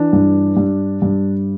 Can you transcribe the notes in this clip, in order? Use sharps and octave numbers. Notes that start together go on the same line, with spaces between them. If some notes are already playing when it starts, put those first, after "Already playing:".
Already playing: E3 D4
G2
G2
G2